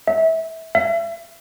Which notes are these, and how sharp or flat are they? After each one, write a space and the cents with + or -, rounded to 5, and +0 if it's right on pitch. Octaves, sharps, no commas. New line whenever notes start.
E5 -25
E5 +35